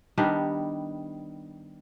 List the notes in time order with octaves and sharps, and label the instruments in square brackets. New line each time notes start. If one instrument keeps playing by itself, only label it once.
[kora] D#3 G3 B3 D4